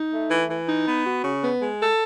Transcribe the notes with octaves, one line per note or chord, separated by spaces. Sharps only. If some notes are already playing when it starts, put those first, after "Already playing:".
Already playing: D#4
A3
E3
E3
D#4
B3
F#4
C#3
B3
G#3
A4